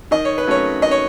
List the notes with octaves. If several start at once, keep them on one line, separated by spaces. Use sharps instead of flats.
D#3 D#5
C#5
B4
F#3 A3 C#4 C#5
D#3 D#5
C#5